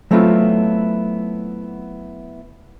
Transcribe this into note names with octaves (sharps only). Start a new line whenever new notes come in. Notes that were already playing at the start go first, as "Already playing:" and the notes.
F#3 A3 B3 C4 E4 F4